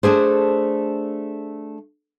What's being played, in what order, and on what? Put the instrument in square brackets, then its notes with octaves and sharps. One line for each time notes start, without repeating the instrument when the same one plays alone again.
[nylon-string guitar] A3 D4 G#4 C5